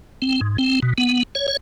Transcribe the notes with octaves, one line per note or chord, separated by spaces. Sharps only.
C4
G#2
C4
B2
B3
C#5
C#5